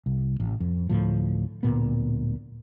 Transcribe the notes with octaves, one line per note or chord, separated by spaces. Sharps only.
C2
A1
F2
D2 A2 F3
D1 D2 A#2 B3